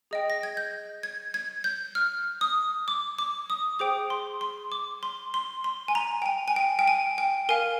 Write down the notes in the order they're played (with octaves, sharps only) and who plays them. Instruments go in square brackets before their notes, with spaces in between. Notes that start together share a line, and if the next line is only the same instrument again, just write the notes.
[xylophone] G#4 D#5 G5
A#6
G#6
G6
G#6
G#6
G6
F6
D#6
D6
D6
D#6
G#4 C5 G5 D6
C6
C6
D6
C6
C6
C6
G#5
A#5
G5
G#5
G#5
G5
G5
G#5
G5
A#4 F5 G#5